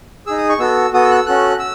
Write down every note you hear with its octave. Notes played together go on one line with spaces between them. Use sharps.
D#4 G#4 E6
D#6
C#6
B3 F#4 A4 E6
B3 F#4 A4 D#6
E6
F#6
E6
C#4 F#4 A4 F#6
E6